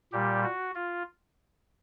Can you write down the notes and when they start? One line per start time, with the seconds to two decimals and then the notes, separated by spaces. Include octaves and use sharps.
0.12 A#2 G3 G4
0.43 F#4
0.75 F4